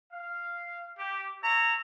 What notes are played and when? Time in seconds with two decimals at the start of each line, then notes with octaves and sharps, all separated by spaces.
0.12 F5
0.97 G4
1.41 C#5 E5 A#5